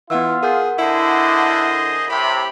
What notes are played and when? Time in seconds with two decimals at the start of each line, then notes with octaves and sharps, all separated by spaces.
0.10 E3 B3 F4 F#5 E6
0.43 G#4 A#4 F#5 G6
0.79 D3 E4 G#4 C5 D#5
2.08 A2 C3 G4 B5